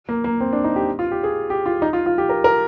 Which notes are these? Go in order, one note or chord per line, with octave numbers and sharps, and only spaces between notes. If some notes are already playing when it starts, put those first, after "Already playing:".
A#3
A#3
C4
D4
D#4
G4
F4
G4
G#4
G4
F4
D#4
F4
F4
G4
A#4
A#4